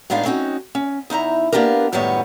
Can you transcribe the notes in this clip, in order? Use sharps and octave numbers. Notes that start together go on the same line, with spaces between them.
A2 G#3 B3 D4 D#4 F5
C4 C#4 D#4 F#4
C#4
E2 D#4 E4 A#5
A#3 B3 D4 F4 G4 A#4
F#2 A2 D#3 G3 B3 C#5